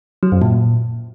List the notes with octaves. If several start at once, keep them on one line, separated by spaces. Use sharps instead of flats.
F#3
F#2
A#2